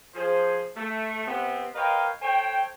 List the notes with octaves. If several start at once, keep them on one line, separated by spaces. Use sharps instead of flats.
F3 G#4 C5
A3
C3 B3 C4
A#4 B4 C#5 D#5 F5 G5
A4 C5 C#5 G5